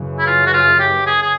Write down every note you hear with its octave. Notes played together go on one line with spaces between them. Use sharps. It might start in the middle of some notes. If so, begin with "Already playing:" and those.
Already playing: F#2 C#3 E3
E4
F4
F#4
F4
G4
G#4
G#4